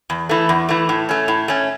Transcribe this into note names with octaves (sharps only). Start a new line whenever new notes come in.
E2
E3 A3
E2
E3 A3
A2
A3 C#4
A2
A3 C#4